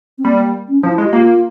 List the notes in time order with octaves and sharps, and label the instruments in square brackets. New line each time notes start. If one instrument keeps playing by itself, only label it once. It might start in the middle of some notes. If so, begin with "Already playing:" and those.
[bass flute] C4
[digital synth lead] G3 [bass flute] A#3
[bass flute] C#4
[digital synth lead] F3 [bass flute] E4
[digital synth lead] G#3
[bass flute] G4
[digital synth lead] A#3 [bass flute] F4